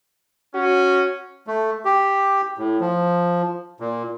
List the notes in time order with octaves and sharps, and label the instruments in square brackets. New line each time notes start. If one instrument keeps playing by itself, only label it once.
[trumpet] C#4 [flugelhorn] F#4
[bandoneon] A3
G4
A2
F3
A#2